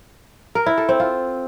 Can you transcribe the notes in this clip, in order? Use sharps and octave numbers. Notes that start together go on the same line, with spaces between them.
A#4
E4
A4
C4
F4